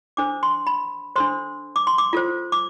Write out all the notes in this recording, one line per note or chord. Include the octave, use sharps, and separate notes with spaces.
D4 A4 C5 D6
C6
B5
D4 A4 C5 C6
D6
C6
D6
F4 A4 C5
D6